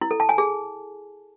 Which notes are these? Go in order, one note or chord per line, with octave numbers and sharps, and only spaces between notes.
E4
A4
A5
G#5
G#4